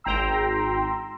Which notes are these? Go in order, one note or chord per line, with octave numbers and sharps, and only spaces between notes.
G#1 G5 A#5 C6 E6